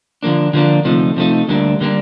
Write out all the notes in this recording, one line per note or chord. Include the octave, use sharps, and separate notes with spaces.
D3 F3 A#3 D4
D3 F3 A#3 D4
C3 F3 A3 D#4
C3 F3 A3 D#4
D2 D3 G3 A#3 D4
D3 G3 A#3 D4